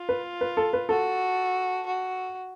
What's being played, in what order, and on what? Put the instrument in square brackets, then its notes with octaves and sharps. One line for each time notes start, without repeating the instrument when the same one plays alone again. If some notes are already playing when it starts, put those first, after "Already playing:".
Already playing: [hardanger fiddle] F4
[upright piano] B4
B4
A4
B4
[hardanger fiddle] F#4 [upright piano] A4
[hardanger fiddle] F#4